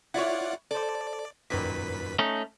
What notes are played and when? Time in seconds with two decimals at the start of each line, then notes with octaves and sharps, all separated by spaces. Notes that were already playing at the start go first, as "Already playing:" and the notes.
0.14 E4 F4 C#5 D5 F#5
0.71 A4 C5 D5
1.50 F#2 A#2 D#3 B4 B6
2.19 A3 C#4 D#4